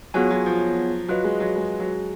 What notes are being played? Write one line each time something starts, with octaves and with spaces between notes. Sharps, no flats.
F#3 B3 F4 G#4 C#5 G#5
F#3
F3
F#3 F4 B4 D#5
G#3
F#3
G#3
F#3